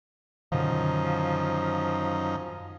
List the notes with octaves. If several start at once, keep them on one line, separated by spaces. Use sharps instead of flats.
F#2 B2 D3 D#3 F3 D#4